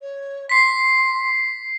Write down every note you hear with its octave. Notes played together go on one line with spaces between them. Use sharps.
C#5
C6 B6 C7